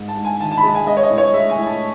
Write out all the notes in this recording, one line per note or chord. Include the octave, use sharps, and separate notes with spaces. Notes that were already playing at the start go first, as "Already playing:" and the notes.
Already playing: G#2
A5
G#2
G#5
D#3 A5
A5
B5
G#3 A5
G#5
G#3 D#5
C#5
D#5
A2
C#5
G#3 E5
G#5
A2
A5